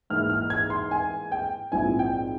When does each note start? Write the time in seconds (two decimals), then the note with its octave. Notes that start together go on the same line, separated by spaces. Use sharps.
0.10 G#2 E3 A#3 E4 F6
0.30 F6
0.50 G#6
0.70 C6
0.91 G#5
1.32 G5
1.72 A#1 G#2 F3 C4 E4 G#5
1.99 G5